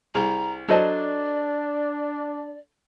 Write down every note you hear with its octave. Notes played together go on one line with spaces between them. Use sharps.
C2 G#4 A#5
F#3 D4 A4 C5 D5 D#5 A5